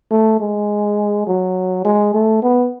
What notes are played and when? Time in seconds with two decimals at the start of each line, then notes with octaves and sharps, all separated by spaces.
0.11 A3
0.41 G#3
1.27 F#3
1.85 G#3
2.14 A3
2.43 B3